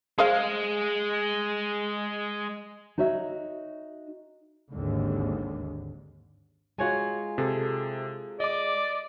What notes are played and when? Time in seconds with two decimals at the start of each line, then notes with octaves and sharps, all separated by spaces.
0.18 G#3 G#4 C5 F5
2.98 D#4 F#4 C#5 D#5 E5
4.71 G#1 D#2 G#2 D3
6.78 G#3 F4 F#4 C#5 G#5
7.38 C3 G#4 A4
8.40 D5 D#5 D6